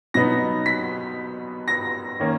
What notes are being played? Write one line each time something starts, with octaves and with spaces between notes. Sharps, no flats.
B2 F#3 B3 D#4 A#6
B6
A#6
D#3 A#3 C#4